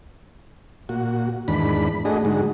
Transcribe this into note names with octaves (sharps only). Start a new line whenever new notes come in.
A#2 F#4
E2 G#2 D#3 D4 B5
A3 D4 F#4 G#4 D#5
G#2 D3 G#3 D#4 F#4